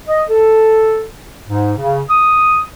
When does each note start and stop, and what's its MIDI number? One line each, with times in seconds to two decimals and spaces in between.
0.07 0.23 75
0.29 1.03 69
1.48 1.73 44
1.78 2.00 49
2.09 2.61 87